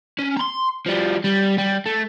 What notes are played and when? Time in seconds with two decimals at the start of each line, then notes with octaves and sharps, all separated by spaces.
0.19 C#4
0.36 A#5 C6
0.86 F3 G3
1.24 G3
1.58 G3
1.86 A3